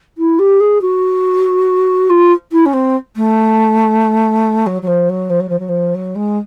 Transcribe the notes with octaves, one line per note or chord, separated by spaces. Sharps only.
E4
G4
G#4
F#4
F4
E4
C#4
C4
A3
F#3
F#3
F3
F#3
F3
F#3
F3
F#3
F3
F#3
G#3